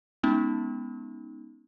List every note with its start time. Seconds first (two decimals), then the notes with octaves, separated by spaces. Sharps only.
0.23 G#3 B3 C#4 D#4